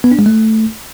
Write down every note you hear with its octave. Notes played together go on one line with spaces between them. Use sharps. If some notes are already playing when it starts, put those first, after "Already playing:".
B3
D4
G#3
A3